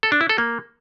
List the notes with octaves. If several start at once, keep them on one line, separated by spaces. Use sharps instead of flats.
A4
D4
E4
A4
A#3